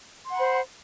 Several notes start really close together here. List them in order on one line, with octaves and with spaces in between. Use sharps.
C6 F#5 B5 C5